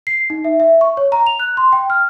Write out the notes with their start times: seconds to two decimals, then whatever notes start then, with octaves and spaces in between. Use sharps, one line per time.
0.07 C7
0.30 D#4
0.44 E5
0.60 E5
0.81 C#6
0.97 C#5
1.12 A#5
1.27 F7
1.40 F#6
1.57 C6
1.73 G5
1.90 F6